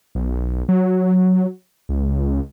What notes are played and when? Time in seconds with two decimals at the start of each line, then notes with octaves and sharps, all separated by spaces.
0.15 B1
0.69 F#3
1.89 C#2